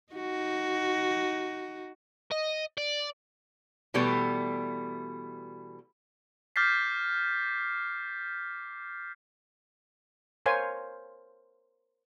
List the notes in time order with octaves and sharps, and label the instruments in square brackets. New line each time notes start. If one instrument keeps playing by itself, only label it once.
[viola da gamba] D#4 F#4
[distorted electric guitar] D#5
D5
[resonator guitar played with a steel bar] B2 E3 G3 A3 B3
[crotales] D6 F6 G6 A6 B6 C7
[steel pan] A#4 C5 C#5 F5 G#5